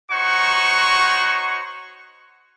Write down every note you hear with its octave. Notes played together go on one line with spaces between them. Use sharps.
D#4 F#4 C5 C#5 F#5 C#6